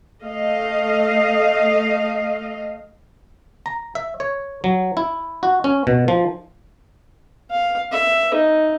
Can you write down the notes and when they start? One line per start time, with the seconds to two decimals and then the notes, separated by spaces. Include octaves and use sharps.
0.23 A3 D#5 F5
3.66 A#5
3.95 E5
4.20 C#5
4.64 F#3
4.97 E4
5.43 F#4
5.64 C#4
5.87 B2
6.08 F3
7.51 F5
7.92 E5
8.34 D#4